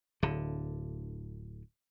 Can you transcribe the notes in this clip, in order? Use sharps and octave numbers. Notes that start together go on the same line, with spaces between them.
D1 D3